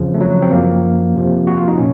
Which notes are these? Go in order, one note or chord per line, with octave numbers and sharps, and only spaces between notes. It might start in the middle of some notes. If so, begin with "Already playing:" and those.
Already playing: F2 C#3 F3
A3
F#3
C4
F#2 F3 A#3
F2 C3 F3
F#4
F4
D#4
A#2 C#4